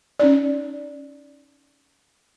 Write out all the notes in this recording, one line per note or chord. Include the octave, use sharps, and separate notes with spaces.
C#4 D#4 D5